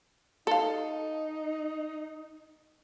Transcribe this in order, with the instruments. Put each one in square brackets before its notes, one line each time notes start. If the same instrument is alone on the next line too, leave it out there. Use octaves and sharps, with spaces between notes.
[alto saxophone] D#4 [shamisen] A4 F5